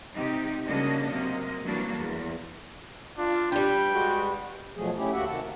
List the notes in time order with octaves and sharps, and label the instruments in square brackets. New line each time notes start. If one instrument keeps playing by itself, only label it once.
[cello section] C3 D#4 G4
C#3 G3 A#3 D4 F#4 D#5
C3 F#3 A#3 D#5
E3 F#3 G3 A#3 D4
E2
[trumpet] D4 [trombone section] F4
[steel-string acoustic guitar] G3 B4 [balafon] D4 G4 [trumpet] G5
[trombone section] G#3 F#4
[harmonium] B2 F3 F#3 A3 G#4
A3 C#4 E4 G4
D2 A#3 F#4 G4 E5 F#5
C3 D#3 F#4 F#5 A5
A#4